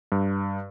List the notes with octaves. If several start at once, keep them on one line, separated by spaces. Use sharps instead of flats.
G2